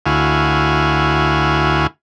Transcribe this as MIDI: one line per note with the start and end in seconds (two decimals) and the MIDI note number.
0.06 1.87 38
0.06 1.87 64
0.06 1.87 66
0.06 1.87 77
0.06 1.87 80